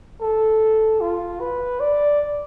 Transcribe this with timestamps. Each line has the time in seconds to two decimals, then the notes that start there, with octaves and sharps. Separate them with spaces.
0.21 A4
1.01 F4
1.40 B4
1.80 D5